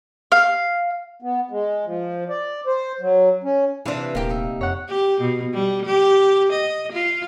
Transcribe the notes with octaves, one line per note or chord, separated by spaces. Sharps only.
F5
B3
G#3
F3
D5
C5
F#3
C#4
C3 E3 D4 C5 F5
D#1 A#3 G4
D#4 E5
F2 C#5 F#5
G4
B2
G3
G4
D#5
F4